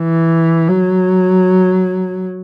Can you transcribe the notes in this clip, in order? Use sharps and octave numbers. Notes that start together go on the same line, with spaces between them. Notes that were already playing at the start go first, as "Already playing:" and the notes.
Already playing: E3
F#3